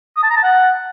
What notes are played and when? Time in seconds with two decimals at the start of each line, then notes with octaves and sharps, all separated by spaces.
0.17 D#6
0.23 A5
0.30 A#5
0.37 A5
0.43 F#5